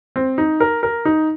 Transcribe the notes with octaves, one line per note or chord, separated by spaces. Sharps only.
C4
D#4
A#4
A#4
D#4